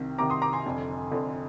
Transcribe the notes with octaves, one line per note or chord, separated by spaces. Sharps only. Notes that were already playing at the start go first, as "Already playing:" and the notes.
Already playing: C2 C3 D#3
C2 C3 D#3 A#5 D6
C6 D#6
A#5 D6
G#5 C6
F1 F2 D3
F1 F2 D3